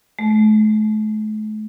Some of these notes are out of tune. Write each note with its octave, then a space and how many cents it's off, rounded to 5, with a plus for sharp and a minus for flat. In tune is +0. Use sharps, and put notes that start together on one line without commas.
A3 -40